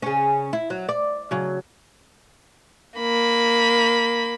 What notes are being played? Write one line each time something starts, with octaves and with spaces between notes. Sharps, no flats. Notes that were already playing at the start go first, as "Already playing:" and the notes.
C#3 C#4
E4
F#3
D5
C#3 F#3
A#3 B5